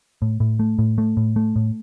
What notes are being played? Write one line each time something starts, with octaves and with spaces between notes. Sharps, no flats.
A2
A2
A3
A2
A3
A2
A3
A2